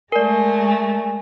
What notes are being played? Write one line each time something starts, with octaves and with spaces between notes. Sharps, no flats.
G#3 A3 A#4 D5 G#5